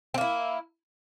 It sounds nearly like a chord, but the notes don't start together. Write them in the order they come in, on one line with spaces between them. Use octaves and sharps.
C4 A#3 E4